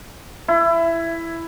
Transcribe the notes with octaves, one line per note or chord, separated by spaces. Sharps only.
E4